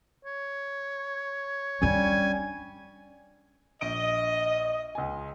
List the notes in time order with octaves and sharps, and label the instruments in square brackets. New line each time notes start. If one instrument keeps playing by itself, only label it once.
[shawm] C#5
[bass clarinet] G3 [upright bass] C#4 D4 [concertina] G#5
[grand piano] A#1 D7 [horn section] D#5
[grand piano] C#2 G#5